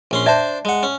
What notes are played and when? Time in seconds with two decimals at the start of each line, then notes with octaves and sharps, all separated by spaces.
0.11 A#1 C#4 C6
0.26 D4 C5 D5 E5 A5
0.65 G#3 F#5
0.83 C#4